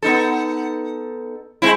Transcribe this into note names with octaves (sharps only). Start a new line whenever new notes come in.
B3 D#4 A4
G#3 C4 E4